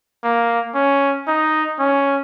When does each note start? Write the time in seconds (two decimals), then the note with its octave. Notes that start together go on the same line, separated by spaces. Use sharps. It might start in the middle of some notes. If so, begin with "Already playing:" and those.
0.23 A#3
0.75 C#4
1.28 D#4
1.79 C#4